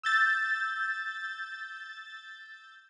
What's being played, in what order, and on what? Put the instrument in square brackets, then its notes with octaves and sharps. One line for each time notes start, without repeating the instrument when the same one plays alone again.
[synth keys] E6 G6 A6